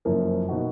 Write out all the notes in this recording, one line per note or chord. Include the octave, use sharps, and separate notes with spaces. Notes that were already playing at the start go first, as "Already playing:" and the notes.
F#1 F#2 F3 A#3
B2 A#3 D#4 F#4